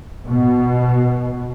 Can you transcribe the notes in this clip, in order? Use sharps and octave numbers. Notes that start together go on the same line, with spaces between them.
B2